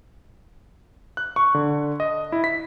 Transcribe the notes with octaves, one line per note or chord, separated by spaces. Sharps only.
F#6
C#6
D3
D#5
E4
B6